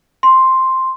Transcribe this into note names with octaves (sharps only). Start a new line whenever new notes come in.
C6